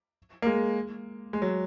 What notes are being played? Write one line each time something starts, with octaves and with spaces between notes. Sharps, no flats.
A#3
G#3
G#3
F#3